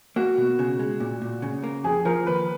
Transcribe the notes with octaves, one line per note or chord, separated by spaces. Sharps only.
A#3 F#4
B2
C#3
G#3
A#2
A#2
C#3
A#3
F2 G#4
F3 A#4
D#2 B4